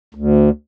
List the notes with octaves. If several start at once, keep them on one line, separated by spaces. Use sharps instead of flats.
D2